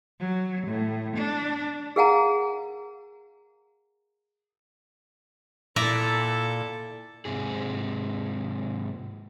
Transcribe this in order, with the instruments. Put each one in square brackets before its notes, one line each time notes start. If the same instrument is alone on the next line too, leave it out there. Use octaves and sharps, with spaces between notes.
[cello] F#3
A2
D4
[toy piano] G#4 A#4 F5 F#5 G#5 A#5
[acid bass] A#2 [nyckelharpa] E4 A4 [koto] D5 E5 A#5
[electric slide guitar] G#2 C3 G#4